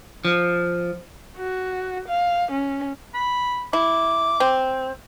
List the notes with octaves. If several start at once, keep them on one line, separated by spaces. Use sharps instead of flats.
F3
F#4
F5
C#4
B5
E4 D6
C4